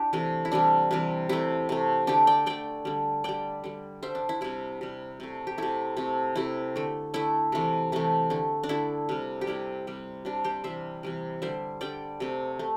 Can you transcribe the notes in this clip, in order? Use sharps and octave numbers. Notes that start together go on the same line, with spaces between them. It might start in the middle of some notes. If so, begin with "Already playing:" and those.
Already playing: D4 E4 G4
C3 E3 A3
E4
C3 E3 G3 D4
C3 E3 G3
C3 A3 E4
C3 A3
D3 A3 D4 G4
D5 G5
D3 A3 D5 G5
D3 G3
D3 G3 D5 G5
D3 G3
D3 G3 C5 E5
D4
E4
C3 G3 E4
C3 G3
C3 A3
G4
C3 A3 E4
C3 A3
C3 A3 E4
D3 A3
D3 A3 E4
C3 E3 A3
C3 E3 A3
D3 A3
D4
D3 A3 E4
C3 G3
G4
C3 G3 E4
C3 G3
C3 G3 D4
G4 C5
C3 E3 G3 C5 E5
C3 E3 G3
D3 G3 C5 E5
D3 G3 D5 G5
C3 A3
A3